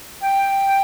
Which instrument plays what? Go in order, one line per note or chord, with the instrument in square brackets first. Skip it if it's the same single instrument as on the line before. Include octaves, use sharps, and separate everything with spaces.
[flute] G5